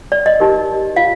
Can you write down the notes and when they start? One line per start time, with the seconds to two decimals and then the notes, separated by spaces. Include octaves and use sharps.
0.12 D5
0.26 D#5
0.40 D#4 G4 A#4
0.96 F4 F5